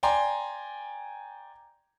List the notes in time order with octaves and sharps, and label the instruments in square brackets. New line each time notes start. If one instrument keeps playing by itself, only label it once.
[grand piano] D5 G5 G#5 A#5 C6